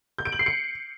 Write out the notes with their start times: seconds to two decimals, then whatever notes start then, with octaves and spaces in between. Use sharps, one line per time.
0.18 G6
0.25 D7
0.32 F#7
0.39 C7
0.46 C#7